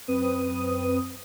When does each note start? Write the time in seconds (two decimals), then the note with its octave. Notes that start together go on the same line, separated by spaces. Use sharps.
0.08 F#2 C4 B4 D#6 D#7